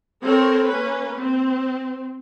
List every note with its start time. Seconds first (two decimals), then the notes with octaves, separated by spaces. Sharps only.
0.22 C4 A4 A#4 C#5
0.69 A#3 C#4 B4
1.20 C4